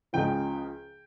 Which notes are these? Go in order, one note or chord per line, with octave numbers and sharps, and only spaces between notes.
C#2 C#3 F3 G5